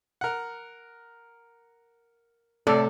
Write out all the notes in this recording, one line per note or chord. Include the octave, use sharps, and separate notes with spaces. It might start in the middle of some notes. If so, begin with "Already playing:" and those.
A#4 F#5
A2 C3 A3 A4 D5 F6